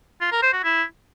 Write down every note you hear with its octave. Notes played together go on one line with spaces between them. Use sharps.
F4
A#4
C5
F#4
E4